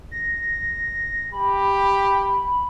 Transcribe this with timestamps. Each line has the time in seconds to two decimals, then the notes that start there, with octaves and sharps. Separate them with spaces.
0.11 A#6
1.32 G4 B5